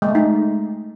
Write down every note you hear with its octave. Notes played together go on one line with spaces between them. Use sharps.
G#3
A3
D#4